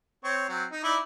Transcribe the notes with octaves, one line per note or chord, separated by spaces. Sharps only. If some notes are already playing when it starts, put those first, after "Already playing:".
C4 C#5
F#3 C4
D#4
D#4 E4 D5